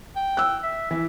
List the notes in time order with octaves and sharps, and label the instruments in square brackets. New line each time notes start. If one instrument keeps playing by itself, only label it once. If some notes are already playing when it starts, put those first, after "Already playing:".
[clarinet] G5
[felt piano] E6 F#6
[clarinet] E5
[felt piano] E3 [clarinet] E5